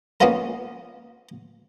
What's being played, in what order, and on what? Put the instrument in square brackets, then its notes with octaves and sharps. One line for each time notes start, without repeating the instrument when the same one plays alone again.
[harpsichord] A#3 B3 C#4 D#4 F4 A#4